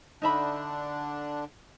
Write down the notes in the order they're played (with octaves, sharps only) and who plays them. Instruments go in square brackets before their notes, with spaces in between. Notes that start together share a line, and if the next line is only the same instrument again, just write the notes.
[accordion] D3 D4 [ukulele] D#4 E5 B5